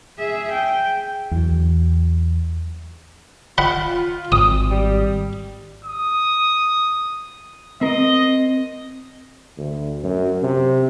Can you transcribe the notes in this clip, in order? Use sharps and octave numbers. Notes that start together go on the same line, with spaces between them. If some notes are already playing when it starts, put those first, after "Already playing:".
G#4 E5
G5
E2 F#3
F4 F#5 B5
G#1 D#6
G3
D#6
C4 A#4 D#5
D2
F#2
C3